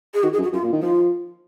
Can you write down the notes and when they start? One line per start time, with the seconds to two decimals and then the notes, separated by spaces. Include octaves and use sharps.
0.14 G#4
0.23 D#3 F#4
0.33 G#4
0.38 F#2
0.43 F#4
0.53 F#2 F4
0.63 A#2
0.72 D#3
0.82 F3 F4